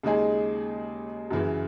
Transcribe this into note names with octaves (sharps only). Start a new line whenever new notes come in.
D#2 C#3 G#3 D#4 G#4
F#2 C#3 E3